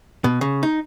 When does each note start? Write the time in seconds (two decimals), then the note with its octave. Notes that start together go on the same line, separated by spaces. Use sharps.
0.24 B2
0.41 C#3
0.63 D#4